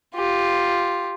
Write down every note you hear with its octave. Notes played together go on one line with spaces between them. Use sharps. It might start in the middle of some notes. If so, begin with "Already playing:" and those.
F4 G4